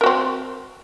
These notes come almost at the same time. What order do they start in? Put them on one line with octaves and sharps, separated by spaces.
A#4 F#4 C4